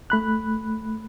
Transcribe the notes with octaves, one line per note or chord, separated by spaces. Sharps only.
A3 B5 F#6